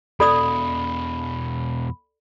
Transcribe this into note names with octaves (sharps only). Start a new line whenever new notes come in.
E2 B2 A4 D5 B5 D#6